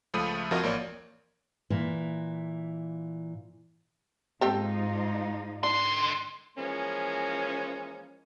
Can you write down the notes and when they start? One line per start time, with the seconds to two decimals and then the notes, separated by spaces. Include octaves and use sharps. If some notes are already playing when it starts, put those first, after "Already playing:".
0.14 C#2 F3 A3 B5 D#6 D#7
0.51 F2 F3 F4 F#4 A#4 D#5
0.63 A1 A#3 C#5 D5
1.70 A#2 E3
4.41 G#2 C4 D#4 F4 G4 A4
5.63 D3 D4 C6
6.57 E3 F3 G#3 A#3 C#4